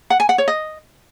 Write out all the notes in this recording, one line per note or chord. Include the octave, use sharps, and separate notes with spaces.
F#5
G#5
F#5
C#5
D#5